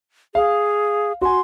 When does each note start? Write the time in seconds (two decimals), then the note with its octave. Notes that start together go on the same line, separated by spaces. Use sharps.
0.35 G#4 F5
1.21 F#4 G#5 C6